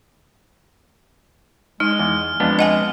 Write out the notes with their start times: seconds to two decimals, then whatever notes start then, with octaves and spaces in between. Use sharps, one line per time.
1.80 G#3 D#4 D#5 F6
1.99 E2
2.40 F2 G#3 B3 D4
2.59 D#5 F#5 G#5